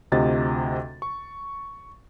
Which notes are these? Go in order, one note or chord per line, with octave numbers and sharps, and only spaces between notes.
D2 C3 F4 D#5 A6
C#6